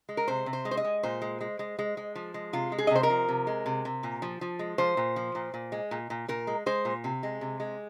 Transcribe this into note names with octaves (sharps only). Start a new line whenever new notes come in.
G#3
A#4
C3 C5
C3
C5
G#3
C5
D#5
G#3
A#2 C5
G#3
G#3
G#3
G#3
G#3
F3
G#3
C3 F4
G#3
G#4
D#5
C3 C5
A#4
F3
C3
G#3
C3
C3
A#2
F3
F3
G#3
F3 C5
A#2
F3
A#2
A#2
G#3
A#2
A#2
A#2 A#4
G#3
G#3 C5
A#2
C3
G#3
C3
G#3